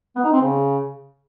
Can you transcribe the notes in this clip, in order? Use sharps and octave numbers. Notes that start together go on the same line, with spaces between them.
B3
D#4
C4
C#3